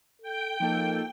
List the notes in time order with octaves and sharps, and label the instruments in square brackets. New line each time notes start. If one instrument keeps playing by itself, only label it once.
[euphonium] A4 [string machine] G5
[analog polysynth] F3 A#3 A4 [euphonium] D#4